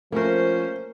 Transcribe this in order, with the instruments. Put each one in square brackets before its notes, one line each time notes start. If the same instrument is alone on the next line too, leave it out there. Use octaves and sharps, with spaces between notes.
[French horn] F3 [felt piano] A3 [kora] A#3 A#4 [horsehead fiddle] C#4 C5